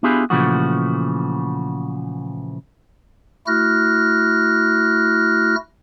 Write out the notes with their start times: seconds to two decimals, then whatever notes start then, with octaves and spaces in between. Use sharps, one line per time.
0.03 B3 D4 E4 F4 G4 G#4
0.30 A#2 C#3 E3 F3 A3 F#4
3.47 A3 E4 F#4 F6 F#6 A#6